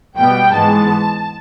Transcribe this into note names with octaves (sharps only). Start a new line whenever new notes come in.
B2 G3 B3 G5
G#2 E3 G#3 B3 A5